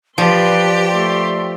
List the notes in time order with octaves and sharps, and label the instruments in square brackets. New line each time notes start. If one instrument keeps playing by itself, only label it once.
[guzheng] F3 [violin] G4 [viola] B4 C6 [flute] D5
[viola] A3 C6